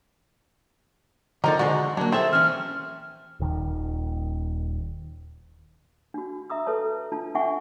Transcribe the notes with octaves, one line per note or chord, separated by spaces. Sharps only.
D3 F3 D#4 A4 A#4
D3 G#3 F#4 C5
F#3 A#3 D4
C4 G#4 A4 E5
E3 C#4 F6
D#1 D#3
D4 F#4
E5 A#5 D#6 E6
A4 B4 C#5 A5
D4 F4 A5
C#4 D4 E5 F#5 G#5 C#6